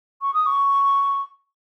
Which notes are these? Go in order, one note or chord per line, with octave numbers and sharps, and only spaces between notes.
C#6
D#6
C#6